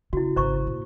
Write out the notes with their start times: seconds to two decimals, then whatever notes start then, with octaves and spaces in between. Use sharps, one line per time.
0.13 C#3 E4 F#4
0.36 G#1 C#3 C5 A#5 C#6
0.67 A#2